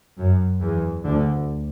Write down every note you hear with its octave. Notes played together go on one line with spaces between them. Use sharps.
F#2
E2 E3
D2 D3